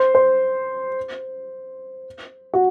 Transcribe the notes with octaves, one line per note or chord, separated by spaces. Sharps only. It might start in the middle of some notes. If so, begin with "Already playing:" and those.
Already playing: C5
C5
F#4